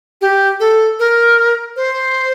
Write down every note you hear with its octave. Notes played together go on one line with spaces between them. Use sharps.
G4
A4
A#4
C5